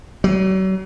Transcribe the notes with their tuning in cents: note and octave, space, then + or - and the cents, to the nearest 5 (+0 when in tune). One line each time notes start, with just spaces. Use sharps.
F#3 +40